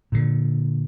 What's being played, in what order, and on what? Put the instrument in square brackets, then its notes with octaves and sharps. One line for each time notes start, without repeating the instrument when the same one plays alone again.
[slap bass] A#2 D3